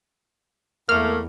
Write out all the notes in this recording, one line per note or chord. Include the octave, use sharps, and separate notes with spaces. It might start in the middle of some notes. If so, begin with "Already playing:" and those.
E2 A3 A#3 F6